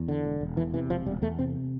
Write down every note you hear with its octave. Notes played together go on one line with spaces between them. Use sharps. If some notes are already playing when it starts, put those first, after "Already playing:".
Already playing: E2
D3
E1
E1
E2 E3
C3 E3
E1 F3
E1 G3
E2 A3
C3 C4